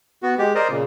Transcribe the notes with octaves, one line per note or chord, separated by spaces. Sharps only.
B3 F#4
G#3 G4
A#4 C5 D5 D#5
A#2 C#3